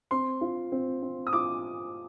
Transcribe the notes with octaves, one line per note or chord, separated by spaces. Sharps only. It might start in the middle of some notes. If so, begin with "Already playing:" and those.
C4 C6
F4
C4
C4
D#6
F4 D6